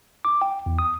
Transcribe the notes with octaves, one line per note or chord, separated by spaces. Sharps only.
D6
G5
E2
D#6